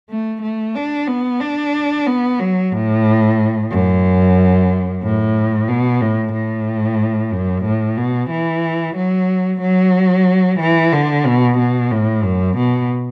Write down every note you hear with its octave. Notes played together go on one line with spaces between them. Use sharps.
A3
A3
D4
B3
D4
B3
F#3
A2
F#2
A2
B2
A2
A2
F#2
A2
B2
E3
F#3
F#3
E3
D3
B2
B2
A2
F#2
B2